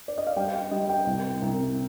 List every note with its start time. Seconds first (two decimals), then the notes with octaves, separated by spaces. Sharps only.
0.08 D5
0.18 D#5
0.27 F5
0.36 G3 G5
0.55 G5
0.71 G3 D#5
0.89 G5
1.07 C2
1.42 C2